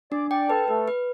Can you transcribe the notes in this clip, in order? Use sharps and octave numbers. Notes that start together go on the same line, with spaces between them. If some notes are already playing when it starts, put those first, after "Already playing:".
D4 D5 D6
D5 G5 D6
A4 B4 A5
A3 A4 B4
B4